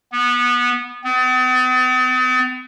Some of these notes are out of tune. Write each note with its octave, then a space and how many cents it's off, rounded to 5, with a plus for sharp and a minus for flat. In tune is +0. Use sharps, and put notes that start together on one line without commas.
B3 -20
B3 +45